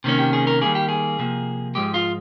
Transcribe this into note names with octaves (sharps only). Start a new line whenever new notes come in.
C3 D#3 A#3 C#4
G4
G#4
A#4
D#3 G3 A#3 G#4
G4
G#4
C3 F3 A#3
G#2 F3 G#3 G4
F4